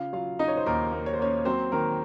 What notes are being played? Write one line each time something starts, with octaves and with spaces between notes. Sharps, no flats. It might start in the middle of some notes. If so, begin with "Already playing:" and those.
Already playing: C#3 F4 F5
F#3 F4 F5
C#3 D#4 D#5
C#5
C5
D#2 A#3 A#4
A#3
C#5
C5
A#3 C#4 C#5
F#3 C4 C5
D#3 A#3 A#4